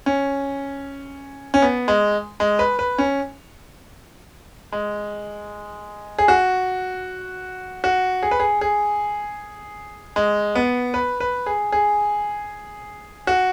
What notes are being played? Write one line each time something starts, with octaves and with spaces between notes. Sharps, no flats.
C#4
C#4
B3
G#3
G#3
B4
B4
C#4
G#3
G#4
F#4
F#4
G#4
B4
G#4
G#4
G#3
B3
B4
B4
G#4
G#4
F#4